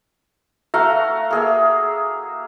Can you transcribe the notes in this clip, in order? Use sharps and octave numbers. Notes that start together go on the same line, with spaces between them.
A3 F#4 F5 A#5
A#3 G#4 E5